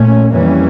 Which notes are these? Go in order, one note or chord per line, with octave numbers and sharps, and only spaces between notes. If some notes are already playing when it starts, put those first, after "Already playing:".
Already playing: A#2 A3 C#4
F2 E3 G3 A#3 C#4